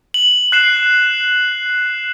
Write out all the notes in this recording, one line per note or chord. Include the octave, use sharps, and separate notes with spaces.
F#7
F#6 C7 E7 F#7